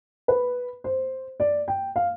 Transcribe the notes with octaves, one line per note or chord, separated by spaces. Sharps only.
B4
C5
D5
G5
F5